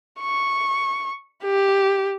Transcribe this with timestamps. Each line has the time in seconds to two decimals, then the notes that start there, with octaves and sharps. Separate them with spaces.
0.21 C#6
1.43 G4